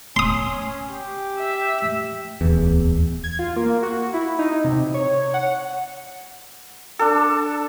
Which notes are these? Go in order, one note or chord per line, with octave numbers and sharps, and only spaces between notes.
C#4 C6 D#6
G4
E5
D1 E2
G#6
F4
A#3
F#4
E4
D#4
C3
C#5
F#5
D4 A4